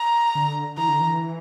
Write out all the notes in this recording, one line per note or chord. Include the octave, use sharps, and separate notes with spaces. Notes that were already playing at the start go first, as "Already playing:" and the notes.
Already playing: A#5
D3
E3 A#5
D3
E3